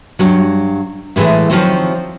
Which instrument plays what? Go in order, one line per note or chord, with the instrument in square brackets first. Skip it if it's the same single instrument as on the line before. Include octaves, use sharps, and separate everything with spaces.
[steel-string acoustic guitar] G2 F#3
A2 D3 E3 G#3 A3
D#3 F3 F#3 C4